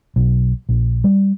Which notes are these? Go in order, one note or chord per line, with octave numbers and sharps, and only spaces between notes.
B1
A#1
G3